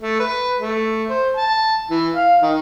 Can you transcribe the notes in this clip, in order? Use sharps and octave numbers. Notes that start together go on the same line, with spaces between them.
A3
B4
A3
C5
A5
E3
F5
D#3